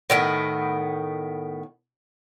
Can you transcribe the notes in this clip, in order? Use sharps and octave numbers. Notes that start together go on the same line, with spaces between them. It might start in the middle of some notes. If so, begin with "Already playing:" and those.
A2 D#3 B3